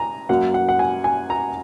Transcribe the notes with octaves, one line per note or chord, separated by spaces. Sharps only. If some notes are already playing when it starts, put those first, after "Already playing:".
Already playing: G#5 A#5
F#2 F#3 A#3 F#5
F#5
F#5
G#5
G#5
A#5